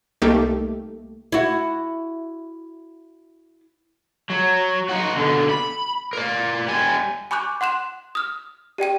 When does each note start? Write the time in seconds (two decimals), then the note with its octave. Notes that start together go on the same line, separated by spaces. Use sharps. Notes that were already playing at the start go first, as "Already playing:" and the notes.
0.22 C2 A3 A#3 D#4 G4
1.32 E4 F#4
4.30 F#3
4.89 D#4 F#4
5.17 B2 D3
5.50 B5
6.13 A#4 D5
6.68 G3 G#5
7.31 G#5 B5 C#6 D6 F#6 G6
7.61 F#5 C6 F#6 E7
8.15 D#6 F6
8.78 G4 D5 G5 D#7